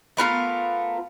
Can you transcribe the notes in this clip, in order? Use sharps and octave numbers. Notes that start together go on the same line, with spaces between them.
A3 B3 F4 A#4